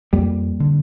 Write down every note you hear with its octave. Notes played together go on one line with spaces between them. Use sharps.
F2 G3 A#3
D3